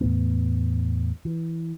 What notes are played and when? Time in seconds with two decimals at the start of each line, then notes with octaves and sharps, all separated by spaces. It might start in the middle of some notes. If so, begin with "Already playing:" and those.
0.01 E2 A2 A3 B3
1.25 E3